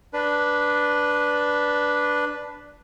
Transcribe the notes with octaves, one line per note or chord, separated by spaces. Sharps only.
D4 B4